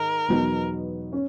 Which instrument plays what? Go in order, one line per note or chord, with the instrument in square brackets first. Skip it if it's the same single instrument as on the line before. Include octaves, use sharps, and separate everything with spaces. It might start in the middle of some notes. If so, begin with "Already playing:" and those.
Already playing: [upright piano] G#2 D#3 D#4 [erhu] A#4
[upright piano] E2 B2 F#3 B3 D#4
C#4